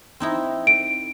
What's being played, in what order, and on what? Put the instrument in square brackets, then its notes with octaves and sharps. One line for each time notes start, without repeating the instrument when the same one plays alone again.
[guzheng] C4 D#4 E4
[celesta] D7